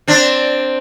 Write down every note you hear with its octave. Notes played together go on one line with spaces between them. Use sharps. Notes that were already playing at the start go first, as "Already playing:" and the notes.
C4 D4